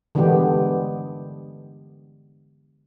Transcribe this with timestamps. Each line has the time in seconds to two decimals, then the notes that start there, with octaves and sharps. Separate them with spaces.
0.15 D3 E3 G#3 B3 G4